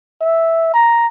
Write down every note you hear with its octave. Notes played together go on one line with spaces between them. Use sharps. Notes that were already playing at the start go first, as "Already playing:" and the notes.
E5
A#5